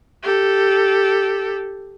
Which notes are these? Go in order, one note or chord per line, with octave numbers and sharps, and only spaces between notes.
G4 A4